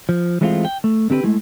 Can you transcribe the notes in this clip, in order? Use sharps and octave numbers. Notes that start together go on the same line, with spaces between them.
F3
E3 G#3 A3 C4 D#4 F4
G5
A3
D3 C4 G4 B4
G#3 A3 E4